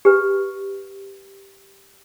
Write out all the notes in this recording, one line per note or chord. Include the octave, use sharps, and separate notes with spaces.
G4 B4